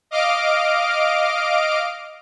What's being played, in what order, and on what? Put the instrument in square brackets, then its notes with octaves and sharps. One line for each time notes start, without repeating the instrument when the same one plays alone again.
[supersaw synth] D#5 F5 D6 F6 D7